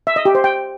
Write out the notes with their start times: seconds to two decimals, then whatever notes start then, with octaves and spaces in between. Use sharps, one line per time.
0.07 E5
0.16 D#5
0.25 G4
0.35 C5
0.44 G5